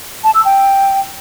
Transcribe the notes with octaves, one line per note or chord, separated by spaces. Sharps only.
A5
E6
G5